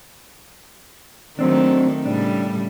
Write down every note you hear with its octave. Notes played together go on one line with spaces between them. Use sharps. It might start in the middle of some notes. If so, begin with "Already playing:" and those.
D#3 F#3 A3 C4 D4
A2 C#3 G3 D4